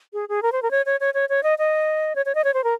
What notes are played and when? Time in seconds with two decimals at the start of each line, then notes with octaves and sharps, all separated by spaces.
0.13 G#4
0.29 G#4
0.42 A#4
0.52 C5
0.62 A#4
0.71 C#5
0.86 C#5
1.00 C#5
1.14 C#5
1.29 C#5
1.43 D#5
1.58 D#5
2.16 C#5
2.26 C#5
2.35 D#5
2.44 C#5
2.54 C5
2.64 A#4